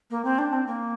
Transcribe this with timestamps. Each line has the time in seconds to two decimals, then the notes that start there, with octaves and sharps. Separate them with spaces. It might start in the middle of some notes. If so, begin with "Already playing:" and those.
0.11 A#3
0.25 C4
0.38 D4
0.53 C4
0.67 A#3